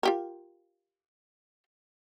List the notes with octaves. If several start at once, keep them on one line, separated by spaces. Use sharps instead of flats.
F4 G4 A#4